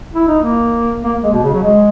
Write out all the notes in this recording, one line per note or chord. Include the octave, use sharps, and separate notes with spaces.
E4
D#4
A#3
A#3
G#3
B2
C#3
F#3
G#3